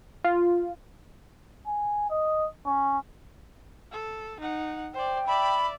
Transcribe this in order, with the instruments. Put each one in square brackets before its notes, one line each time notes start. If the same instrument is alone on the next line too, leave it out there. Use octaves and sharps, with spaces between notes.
[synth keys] F4
[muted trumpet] G#5
D#5
C#4
[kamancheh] A4
D#4 F#5
[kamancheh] C5 D5 [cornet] G5
[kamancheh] D5 E5 [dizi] B5